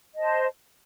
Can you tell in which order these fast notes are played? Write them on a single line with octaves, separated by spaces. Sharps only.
D#5 A5 C5